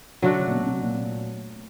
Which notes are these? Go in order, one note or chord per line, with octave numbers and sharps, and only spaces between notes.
D3 F#3 A3 D4 F#4
C#3
A#2
B2
C3
A#2